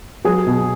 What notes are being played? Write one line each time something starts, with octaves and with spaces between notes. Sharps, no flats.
F#3 G#4
B2